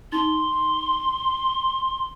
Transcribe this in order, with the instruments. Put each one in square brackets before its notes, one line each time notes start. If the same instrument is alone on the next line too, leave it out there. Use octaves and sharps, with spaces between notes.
[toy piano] D#4 [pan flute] C6